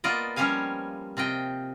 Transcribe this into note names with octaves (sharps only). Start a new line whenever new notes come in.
A#3 B3 F4 D5 D#5
F3 G3 C#4 C#5 F5 G#5
C3 F4 D#5 G5